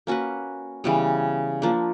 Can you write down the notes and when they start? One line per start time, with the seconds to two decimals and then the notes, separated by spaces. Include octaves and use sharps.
0.07 A#3 C#4 F#4 B4
0.84 C#3 E3 G3 B3
1.62 F3 A#3 D4